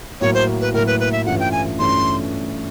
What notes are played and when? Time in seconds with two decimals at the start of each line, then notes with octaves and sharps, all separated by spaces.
0.21 A2 F#3 A#3 C#5
0.34 C5
0.61 B4
0.73 A2 F#3 A#3 A#4
0.87 B4
1.00 B4
1.12 E5
1.26 G2 E3 A3 C#4 F4 F#5
1.40 G5
1.52 G#5
1.78 G2 E3 A3 C#4 F4 C6